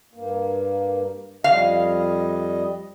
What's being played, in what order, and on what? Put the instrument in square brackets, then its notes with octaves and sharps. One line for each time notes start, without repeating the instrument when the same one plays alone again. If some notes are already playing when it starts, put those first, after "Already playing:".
[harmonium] G2 A#3
[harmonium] F2 G3 D#5 [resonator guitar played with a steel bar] F5